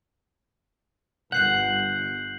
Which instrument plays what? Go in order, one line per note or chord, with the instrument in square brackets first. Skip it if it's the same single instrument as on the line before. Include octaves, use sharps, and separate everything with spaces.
[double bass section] G1 [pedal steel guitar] F#5 [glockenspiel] G6 C7 F#7